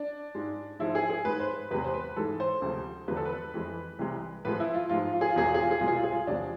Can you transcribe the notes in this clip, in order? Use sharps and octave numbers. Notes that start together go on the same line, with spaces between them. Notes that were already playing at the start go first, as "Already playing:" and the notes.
Already playing: D4
G#2 G#3
G#2 F3 G#3 E4
G#4
G#4
G#2 G#3 B4
C5
B4
E2 C3 G#3 B4
C5
B4
G#2 E3 G#3 A4
C5
D2 C3 F3 G#3
E2 D3 F3 G#3 B4
A4
B4
F2 E3 G#3
C2 C3 E3 G#3
A2 F3 G#3 B4
E4
F4
G#2 F3 G#3 F4
F4
G#4
F4
E2 B2 G#3 G#4
F4
G#4
F4
G#4
C2 B2 G#3 F4
G#4
F4
G#4
F4
E2 C3 F3 G#3 D4